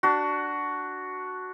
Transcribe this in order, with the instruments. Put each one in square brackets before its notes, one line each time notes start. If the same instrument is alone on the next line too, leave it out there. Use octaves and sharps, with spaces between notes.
[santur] D4 F#4